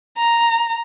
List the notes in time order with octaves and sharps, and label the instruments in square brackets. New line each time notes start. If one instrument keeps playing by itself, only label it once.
[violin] A#5